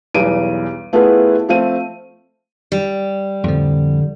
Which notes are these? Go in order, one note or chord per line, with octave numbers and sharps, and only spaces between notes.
B1 E2 G3 D7 D#7
A3 B3 E4 F4 G#4 B4
F3 A3 C4 F5 D#7
G3
F2 A2 D3 F3